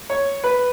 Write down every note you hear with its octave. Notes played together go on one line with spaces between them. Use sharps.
C#5
B4